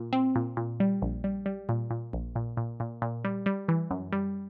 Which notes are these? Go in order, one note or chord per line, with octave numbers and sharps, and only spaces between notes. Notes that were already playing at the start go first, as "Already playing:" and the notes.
Already playing: A#2
C4
A#2
A#2
G3
A#1
G3
G3
A#2
A#2
A#1
A#2
A#2
A#2
A#2
G3
G3
E3
F#2
G3